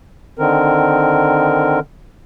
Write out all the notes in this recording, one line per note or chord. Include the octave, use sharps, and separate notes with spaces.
D3 D#3 C4 A#4